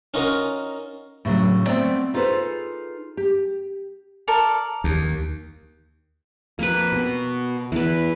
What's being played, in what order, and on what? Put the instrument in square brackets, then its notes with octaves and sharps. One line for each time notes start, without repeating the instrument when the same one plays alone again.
[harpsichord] C#4 D#4 F4 F#4 A#4
[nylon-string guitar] A2 C#3 E3 F#3
A3 B3 C4 D5 G5
D#4 F4 G#4 A4 B4 C5
G4
[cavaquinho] A4 A#4 D5
[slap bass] D#2
[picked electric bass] F2 [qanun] A#3 B4
[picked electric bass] B2
[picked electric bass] E2 [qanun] E3 B4